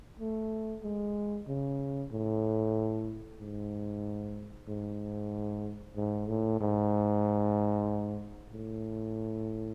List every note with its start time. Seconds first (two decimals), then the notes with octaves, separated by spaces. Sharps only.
0.19 A3
0.83 G#3
1.48 C#3
2.12 A2
3.40 G#2
4.68 G#2
5.96 G#2
6.28 A2
6.60 G#2
8.52 A2